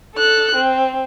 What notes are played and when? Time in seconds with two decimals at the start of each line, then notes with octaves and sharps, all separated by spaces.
0.15 A4 F#6
0.55 C4